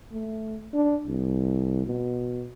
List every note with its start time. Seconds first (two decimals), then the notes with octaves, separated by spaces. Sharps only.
0.12 A3
0.74 D4
1.07 C2
1.86 B2